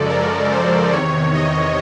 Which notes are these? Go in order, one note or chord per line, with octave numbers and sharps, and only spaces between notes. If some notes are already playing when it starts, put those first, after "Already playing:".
Already playing: F#2 C#3 F3 G#3 A4 D5
A#4
C5
E2 C3 D#3 C#5
D#5